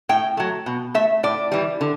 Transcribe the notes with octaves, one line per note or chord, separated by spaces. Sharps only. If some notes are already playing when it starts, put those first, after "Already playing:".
A2 G5
F#3 A3
B2
A3 E5
A2 D5
E3 G3
D3